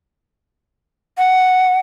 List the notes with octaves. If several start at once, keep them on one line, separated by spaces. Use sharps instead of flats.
F#5